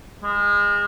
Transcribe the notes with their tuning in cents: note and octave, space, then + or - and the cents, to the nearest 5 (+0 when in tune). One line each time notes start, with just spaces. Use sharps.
G#3 -30